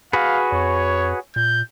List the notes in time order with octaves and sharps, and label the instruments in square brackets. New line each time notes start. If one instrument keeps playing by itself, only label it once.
[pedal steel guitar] F#4 G#4 B4 [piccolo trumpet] F5
[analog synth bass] F2 [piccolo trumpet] C#5
[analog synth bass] A#2 [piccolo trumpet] G6